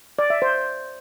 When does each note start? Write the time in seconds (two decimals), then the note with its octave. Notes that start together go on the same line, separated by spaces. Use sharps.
0.19 D5
0.30 E5
0.42 C5